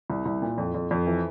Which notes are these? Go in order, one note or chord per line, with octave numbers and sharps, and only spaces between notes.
C2
C2
A#2
F2
F2
F2
E3